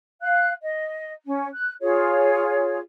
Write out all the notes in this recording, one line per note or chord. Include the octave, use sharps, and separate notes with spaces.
F5 F#6
D#5
C#4
F#6
F4 G#4 C#5